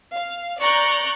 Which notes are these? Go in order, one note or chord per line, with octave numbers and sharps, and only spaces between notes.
F5
D5 A#5 C#6 F#6 G6